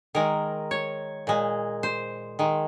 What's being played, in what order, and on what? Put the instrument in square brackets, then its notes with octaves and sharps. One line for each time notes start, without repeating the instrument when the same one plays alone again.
[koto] D#3 G#3 A#4
C#5
A#2 G#3
C5
D#3 G#3